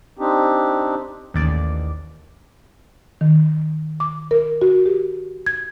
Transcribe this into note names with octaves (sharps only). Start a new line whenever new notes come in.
C4 D4 D#4 G4
A1 D#2 D5
D#3
D6
A#4
F#4
G4
G#6